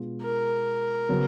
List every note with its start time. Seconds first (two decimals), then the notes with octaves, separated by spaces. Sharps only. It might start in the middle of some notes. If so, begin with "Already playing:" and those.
Already playing: B2 G#3 B3 D4 F4
0.23 A#4
1.09 C#3 F#3 B3